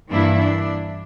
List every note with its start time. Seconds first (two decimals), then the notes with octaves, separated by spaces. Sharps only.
0.11 G2 E3 A#3 D4 E4
0.39 D4